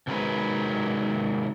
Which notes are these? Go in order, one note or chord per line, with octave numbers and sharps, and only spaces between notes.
C3 D#3 F#3 G#3 B4